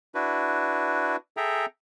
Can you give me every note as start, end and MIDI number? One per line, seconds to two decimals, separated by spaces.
0.15 1.16 62
0.15 1.16 64
0.15 1.16 66
0.15 1.16 71
1.37 1.66 68
1.37 1.66 69
1.37 1.66 76
1.37 1.66 79
1.37 1.66 82